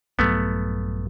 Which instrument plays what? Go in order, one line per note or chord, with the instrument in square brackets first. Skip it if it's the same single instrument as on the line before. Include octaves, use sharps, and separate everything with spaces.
[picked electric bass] A#1 G2 F#3 [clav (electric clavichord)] A3 B3